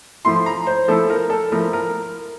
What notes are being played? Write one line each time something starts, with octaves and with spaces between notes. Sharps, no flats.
F3 A3 E4 C6
A#5
C5
F3 A3 E4 A4
A#4
A4
F3 A3 E4 A#4
A#4